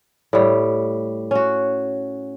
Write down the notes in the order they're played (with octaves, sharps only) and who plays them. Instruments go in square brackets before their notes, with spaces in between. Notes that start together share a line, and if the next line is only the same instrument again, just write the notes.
[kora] A2 G3
C#4 F#4